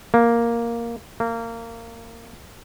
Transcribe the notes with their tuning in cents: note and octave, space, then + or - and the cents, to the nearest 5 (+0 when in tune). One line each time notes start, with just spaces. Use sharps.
A#3 +0
A#3 -25